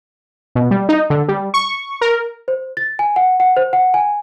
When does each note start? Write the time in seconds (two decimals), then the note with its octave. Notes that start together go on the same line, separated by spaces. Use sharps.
0.55 B2
0.71 G3
0.89 D#4
1.10 D3
1.28 G3
1.54 C#6
2.01 A#4
2.48 C5
2.77 A6
2.99 G#5
3.16 F#5
3.40 F#5
3.57 C5
3.73 F#5
3.94 G#5